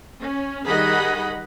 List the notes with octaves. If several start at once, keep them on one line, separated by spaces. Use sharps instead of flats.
C#4
D#3 G3 G#4 D#5 F#5 B5